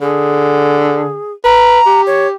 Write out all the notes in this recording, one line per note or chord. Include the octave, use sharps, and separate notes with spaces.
D3 G#4
B4 A#5
G4
C#5